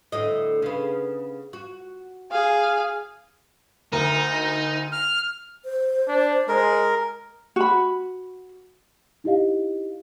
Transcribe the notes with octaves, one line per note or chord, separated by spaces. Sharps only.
D2 A2 D#5
C#3 B3
F#4
G#4 F5
D2 D#4 A#4
F6
C5
D4
G#3 A#4
F#4 B5
D#4 E4 G4 D#5 F5